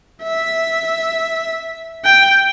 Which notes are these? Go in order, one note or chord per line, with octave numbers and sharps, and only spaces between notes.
E5
G5